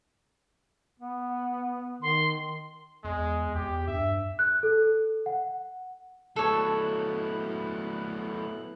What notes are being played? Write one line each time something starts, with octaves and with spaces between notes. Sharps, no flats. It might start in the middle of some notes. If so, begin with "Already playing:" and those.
B3
D#3 C6
E2 G#3
E2 G4
G2 E5
F#6
A4
F#5
F#3 A3 B3 E4 A4 C#5 F#6